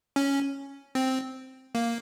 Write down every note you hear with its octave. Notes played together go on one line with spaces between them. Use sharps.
C#4
C4
A#3